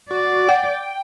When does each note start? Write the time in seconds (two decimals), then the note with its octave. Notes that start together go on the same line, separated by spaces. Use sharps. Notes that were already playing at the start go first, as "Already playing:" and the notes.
0.11 F#4 D5
0.49 F#5 G5